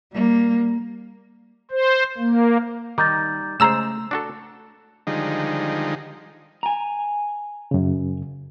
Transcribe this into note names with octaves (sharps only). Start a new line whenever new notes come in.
G3 A#3
C5
A#3
D#3 G3 D#4 A#5 D6 G6 A6
C#3 G#3 A3 C5 A#5 E6 E7
D4 F#4 A4
D3 D#3 F3 G3 G#3 D#4
G#5 A#5
F#2 C#3